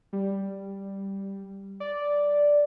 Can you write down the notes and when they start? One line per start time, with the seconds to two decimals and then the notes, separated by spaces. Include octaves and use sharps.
0.13 G3
1.80 D5